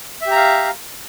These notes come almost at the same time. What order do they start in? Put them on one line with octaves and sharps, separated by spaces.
E5 G4 A#5 F5